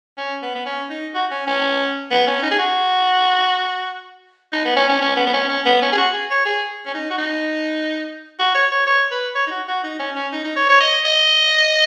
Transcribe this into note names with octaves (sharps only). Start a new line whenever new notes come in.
C#4
B3
B3
C#4
D#4
F#4
C#4
C#4
B3
C#4
D#4
G#4
F#4
D#4
B3
C#4
C#4
C#4
B3
B3
C#4
C#4
B3
C#4
G#4
F#4
G#4
C#5
G#4
C#4
D#4
F#4
D#4
F#4
C#5
C#5
C#5
B4
C#5
D#4
F#4
F#4
D#4
C#4
C#4
D#4
D#4
C#5
C#5
D#5
D#5